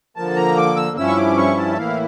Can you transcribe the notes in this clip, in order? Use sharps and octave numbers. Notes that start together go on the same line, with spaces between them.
D3 F3 A#3 A5
A#5
D6
E6
G2 F3 C#4 E4 E6
C#6
D6
C#6
A5
E5
A2 E3 A#3 E4 F5